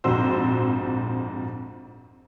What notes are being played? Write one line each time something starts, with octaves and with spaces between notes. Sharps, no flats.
A#1 F2 G#2 F#4 C5 E6